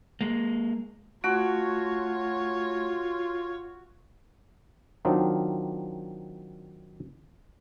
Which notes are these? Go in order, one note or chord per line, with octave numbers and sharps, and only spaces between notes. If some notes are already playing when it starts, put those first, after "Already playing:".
G#3 A#3
A3 F4 F#4 C#5
D#3 F#3 C4 D4 D#4 F4